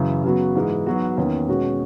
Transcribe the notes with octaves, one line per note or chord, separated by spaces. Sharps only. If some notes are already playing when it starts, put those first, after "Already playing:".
Already playing: F#2 C#3 E3
C#3 F#3 B3 F#4
G#2 E3 G#3 D#4
G#2 F#3 B3 F#4
E2 D#3 A#3 C#4
B2 G#3 C#4 F#4